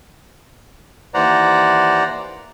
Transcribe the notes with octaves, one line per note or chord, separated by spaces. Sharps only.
D#2 E3 C5 D5 F#5 A#5